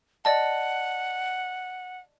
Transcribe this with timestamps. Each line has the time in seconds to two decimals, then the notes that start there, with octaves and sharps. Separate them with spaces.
0.25 D5 D#5 F#5 A5